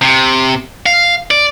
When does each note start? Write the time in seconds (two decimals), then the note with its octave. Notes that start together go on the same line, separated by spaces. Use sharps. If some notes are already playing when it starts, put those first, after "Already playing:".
0.02 C3
0.86 F5
1.31 D5